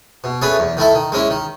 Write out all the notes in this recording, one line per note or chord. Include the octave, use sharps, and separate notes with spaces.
B2
A3 C#4 G#4 B4
E2
D#3 A3 E4 A4
D#3
G#3 C#4 E4
D#3